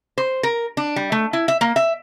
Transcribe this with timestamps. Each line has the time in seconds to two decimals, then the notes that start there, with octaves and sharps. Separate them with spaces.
0.18 C5
0.43 A#4
0.77 D4
0.96 G3
1.12 A3
1.33 E4
1.48 E5
1.61 A#3
1.76 E5